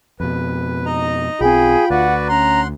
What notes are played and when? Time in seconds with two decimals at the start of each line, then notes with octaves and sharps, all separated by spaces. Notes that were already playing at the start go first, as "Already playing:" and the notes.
0.20 F2 B2 B4
0.85 D#4 D#5 A#5
1.41 B1 C4 F4 G#4 G5 B5
1.90 D2 F#4 B4 D5 F#5
2.29 C#4 F#5 A#5 C6